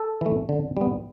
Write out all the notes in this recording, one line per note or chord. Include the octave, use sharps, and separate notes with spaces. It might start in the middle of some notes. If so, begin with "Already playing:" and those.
Already playing: A4
E3 A3
D3
G3 B3